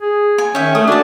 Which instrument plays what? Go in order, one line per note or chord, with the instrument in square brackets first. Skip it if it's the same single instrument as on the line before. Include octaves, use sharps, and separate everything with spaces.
[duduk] G#4
[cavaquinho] G#5
[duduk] D#3 [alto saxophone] C#4 [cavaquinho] E5 G5
[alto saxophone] A3 [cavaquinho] D#6
[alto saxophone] D4 [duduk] F#4 [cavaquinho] G#5 A5